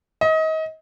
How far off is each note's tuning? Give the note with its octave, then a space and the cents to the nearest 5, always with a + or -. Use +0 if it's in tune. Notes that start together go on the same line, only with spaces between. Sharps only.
D#5 +30